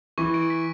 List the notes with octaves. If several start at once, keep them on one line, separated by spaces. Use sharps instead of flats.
E3 C#6
D7
B6